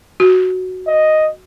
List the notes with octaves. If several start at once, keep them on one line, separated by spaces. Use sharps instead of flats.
F#4
D#5